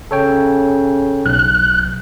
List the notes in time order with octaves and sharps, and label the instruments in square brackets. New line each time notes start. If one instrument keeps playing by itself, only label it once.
[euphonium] C#3 [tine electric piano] A4 C#5 G5
[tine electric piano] B1 [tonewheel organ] F#6